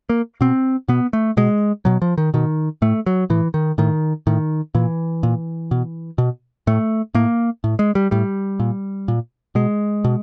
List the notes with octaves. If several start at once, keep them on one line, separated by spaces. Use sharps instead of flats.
A#3
B2 C4
B2 B3
A3
B2 G#3
B2 F#3
F3
D#3
B2 D#3
A2 A3
F#3
A2 E3
D#3
A2 D#3
A2 D#3
A#2 E3
A#2
B2
B2
A2 A3
A2 A#3
A2
G#3
G3
A2 G3
A#2
A#2
B2 G#3
B2